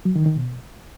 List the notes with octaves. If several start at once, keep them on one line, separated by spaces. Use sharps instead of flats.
F#3
D#3
D#3
B2